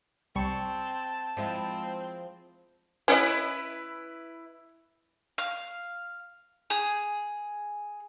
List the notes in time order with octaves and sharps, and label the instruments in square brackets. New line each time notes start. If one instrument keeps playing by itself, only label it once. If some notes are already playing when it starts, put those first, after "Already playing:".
[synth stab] C2 G3 C#6 [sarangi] C4 [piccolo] A5
[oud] F3 G#3 E4 [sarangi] C4
[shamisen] C#4 C#5 D#5 [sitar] E4 B4
[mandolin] F5
G#4